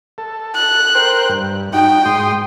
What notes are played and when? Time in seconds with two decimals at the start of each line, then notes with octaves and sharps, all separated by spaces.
0.18 A4
0.55 F#6
0.95 A#4 C5 G5
1.29 G2
1.73 D#4 F#4 G5
2.05 G#2 C6 D#6